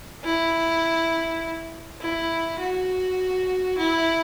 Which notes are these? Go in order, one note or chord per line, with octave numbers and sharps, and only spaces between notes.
E4
E4
F#4
E4